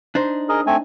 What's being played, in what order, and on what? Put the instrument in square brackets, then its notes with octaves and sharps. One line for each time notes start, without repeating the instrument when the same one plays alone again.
[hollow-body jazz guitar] D4 D#4 C5
[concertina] G#4 A#4 D#5
A3 C4 G#5